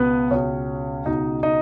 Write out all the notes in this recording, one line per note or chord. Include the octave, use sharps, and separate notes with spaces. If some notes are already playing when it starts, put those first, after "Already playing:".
Already playing: C#2 B2 B3 B4
C#2 B2 C#4 C#5
C#2 B2 D#4 D#5
D#4 D#5